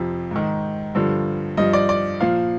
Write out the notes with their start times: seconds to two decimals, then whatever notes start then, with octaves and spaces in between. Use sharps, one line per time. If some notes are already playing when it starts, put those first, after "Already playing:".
Already playing: F2 C3 F3
0.31 G#2 D#3
0.95 G2 D3 F3
1.57 G2 F3 D#5
1.73 D5
1.89 D5
2.21 A#2 F3 F5